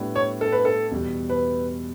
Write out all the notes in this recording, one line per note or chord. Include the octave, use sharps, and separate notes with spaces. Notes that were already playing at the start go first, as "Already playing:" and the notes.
Already playing: A2 G3 B3 D4
C#5
A4
B4
A4
E2 B2 G3
B4